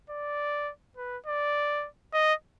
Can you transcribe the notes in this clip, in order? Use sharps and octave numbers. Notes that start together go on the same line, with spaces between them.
D5
B4
D5
D#5